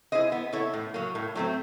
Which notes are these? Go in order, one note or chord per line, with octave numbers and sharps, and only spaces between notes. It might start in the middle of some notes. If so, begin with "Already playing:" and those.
E4 G#4 C5 D#5
B3
E4 A4 C#5
A2
F#3 A#3
A2
F#3 A3 C4